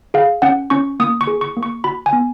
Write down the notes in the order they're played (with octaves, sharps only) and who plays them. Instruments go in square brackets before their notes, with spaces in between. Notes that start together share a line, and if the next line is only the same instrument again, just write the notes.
[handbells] G#4 F5
C#4 F#5
C#4 C#6
A#3 D#6
C#6
G#4
C#6
A#3
C#6
F#4 B5
G#5
B3